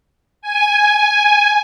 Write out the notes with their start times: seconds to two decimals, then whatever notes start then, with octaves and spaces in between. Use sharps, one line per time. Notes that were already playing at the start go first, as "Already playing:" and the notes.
0.42 G#5